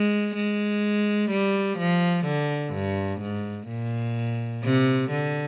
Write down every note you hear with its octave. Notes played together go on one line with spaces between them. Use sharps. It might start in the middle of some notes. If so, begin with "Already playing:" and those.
Already playing: G#3
G#3
G3
F3
D3
G2
G#2
A#2
C3
D3